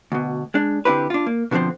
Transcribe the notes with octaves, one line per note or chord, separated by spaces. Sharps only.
D2 B2
G#3 D4
D3 C4 E4 G4 B4
D4 F4
A#3
B2 D3 E3 F3 C4